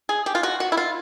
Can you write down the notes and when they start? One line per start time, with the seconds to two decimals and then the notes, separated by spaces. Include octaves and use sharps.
0.09 G#4
0.26 G4
0.35 F4
0.43 F#4
0.60 F#4
0.72 E4
0.77 F4